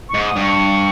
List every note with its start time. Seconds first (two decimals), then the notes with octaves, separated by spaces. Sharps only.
0.09 C#6
0.14 G#2
0.25 D#6
0.36 G2
0.41 C#6